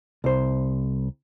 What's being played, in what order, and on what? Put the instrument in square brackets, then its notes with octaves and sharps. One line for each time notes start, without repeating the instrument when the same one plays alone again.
[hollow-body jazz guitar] C2 C5